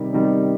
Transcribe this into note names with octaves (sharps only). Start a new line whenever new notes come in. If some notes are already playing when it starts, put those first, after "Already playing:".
Already playing: C3 D#3 G3
C3 D#3 G3